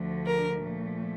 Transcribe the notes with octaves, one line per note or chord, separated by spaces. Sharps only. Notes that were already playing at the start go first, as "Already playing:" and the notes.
Already playing: D2 D3 F3 A3
A#4
A#2 F3 A3